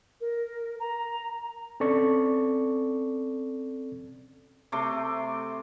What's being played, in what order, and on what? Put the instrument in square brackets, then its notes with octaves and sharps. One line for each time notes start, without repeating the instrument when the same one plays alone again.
[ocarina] A#4
A#5
[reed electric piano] C4 C#4 A4 D5 C#6
[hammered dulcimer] C3 A3 C6 D6